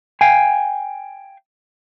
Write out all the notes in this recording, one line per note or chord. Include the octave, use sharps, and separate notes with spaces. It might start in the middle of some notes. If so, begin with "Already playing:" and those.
F5 G5 G#5